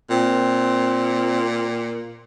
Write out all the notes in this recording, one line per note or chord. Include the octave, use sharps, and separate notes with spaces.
A#2 C4